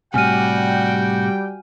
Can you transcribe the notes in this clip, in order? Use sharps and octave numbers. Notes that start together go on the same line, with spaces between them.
A2 C3 G3 F#4 G5 G#5 F6 D#7